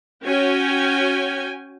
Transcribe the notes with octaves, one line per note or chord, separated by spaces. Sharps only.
C#4 F#4 C#5 G5 G#5